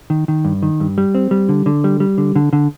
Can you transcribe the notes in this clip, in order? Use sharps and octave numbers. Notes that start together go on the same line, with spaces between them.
D#3
D#3
G2
D#3
G2
G3
C4
G3
D3
D3
G3
G3
D3
D3
D3